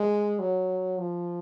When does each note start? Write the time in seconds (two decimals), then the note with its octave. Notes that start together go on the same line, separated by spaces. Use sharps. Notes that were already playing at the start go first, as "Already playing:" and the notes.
Already playing: G#3
0.40 F#3
0.98 F3